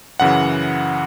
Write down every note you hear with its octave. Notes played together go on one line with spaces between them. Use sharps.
F#2 C#3 E3 F#5